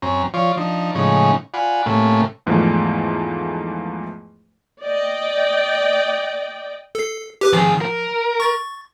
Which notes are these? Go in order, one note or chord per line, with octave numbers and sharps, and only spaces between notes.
F#2 C4 C#4 A#5
F3 F4 C#5 D5
F3 D4 D#4
A2 C#3 F3 G#3 C#4 D#4
F4 D5 F#5 G#5 B5
A2 C3 A3 A#3 C#4
E2 G#2 E3 F3 A3
D5 D#5 G5
A4 C7
G4 B4 D6
D#3 F3 G#4
A#4
C#6 A6